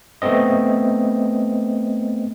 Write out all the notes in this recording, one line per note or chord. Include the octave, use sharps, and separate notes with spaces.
A3 B3 C4 D#5